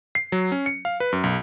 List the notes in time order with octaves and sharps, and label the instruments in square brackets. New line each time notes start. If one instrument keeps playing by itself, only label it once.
[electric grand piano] C7
F#3
C#4
C#7
F5
B4
F#2
B1